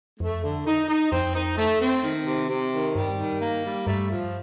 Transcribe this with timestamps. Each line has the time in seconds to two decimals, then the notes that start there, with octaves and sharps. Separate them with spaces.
0.20 F2 A3
0.43 D3
0.66 D#4
0.89 D#4
1.11 F2 C4
1.34 D#4
1.57 A3
1.81 C4
2.03 D#3
2.27 C3
2.49 C3
2.72 D#3
2.95 G2 G3
3.18 D#3
3.41 A#3
3.64 G3
3.87 G2 A3
4.10 F3